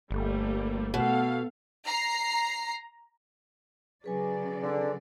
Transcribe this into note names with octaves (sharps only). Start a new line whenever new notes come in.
G1 G3 A3 A#3
B2 A3 A4 F5
A#5 C7
C#3 F#3 G#4 B4 D5 G#5
D3